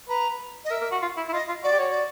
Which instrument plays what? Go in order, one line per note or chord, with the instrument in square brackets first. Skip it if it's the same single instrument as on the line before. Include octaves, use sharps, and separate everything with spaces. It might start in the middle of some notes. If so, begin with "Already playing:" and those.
[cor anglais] B4 [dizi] A#5
[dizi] D#5
[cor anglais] A#4 [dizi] E5
[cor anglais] A#4
F#4
F4
E4
E4
[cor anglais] F4 [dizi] D#5
[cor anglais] F4
[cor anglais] F#4 [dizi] D5
[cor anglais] G4
[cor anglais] F#4 [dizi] C#5
[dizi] D5